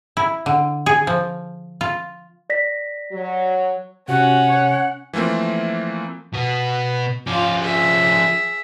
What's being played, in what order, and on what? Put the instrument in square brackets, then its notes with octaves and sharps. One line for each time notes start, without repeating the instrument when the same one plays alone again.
[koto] E4
D3
G#4
F3
F4
[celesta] D5 A#6 B6
[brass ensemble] F#3
[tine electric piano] C3 [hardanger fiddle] C#4 [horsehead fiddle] F#4 [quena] F#5
[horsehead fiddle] C#5
[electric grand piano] E3 F3 A3 A#3 C4
[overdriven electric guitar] B2 B3
[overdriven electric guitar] F3 C#4 [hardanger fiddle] F4 D6
[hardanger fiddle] G#4 E5